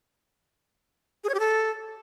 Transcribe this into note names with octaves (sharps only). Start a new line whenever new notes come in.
G#4
C#5
G4
A4